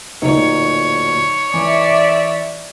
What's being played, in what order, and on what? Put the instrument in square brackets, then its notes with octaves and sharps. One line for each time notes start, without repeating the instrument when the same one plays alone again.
[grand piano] D1 A#2 [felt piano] D#4 [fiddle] C#5
[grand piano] E3 [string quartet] D5 E5